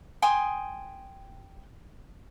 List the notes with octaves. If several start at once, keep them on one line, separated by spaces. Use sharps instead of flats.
G5 G#5 C6 D#6